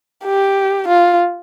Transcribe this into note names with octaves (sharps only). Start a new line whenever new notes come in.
G4
F4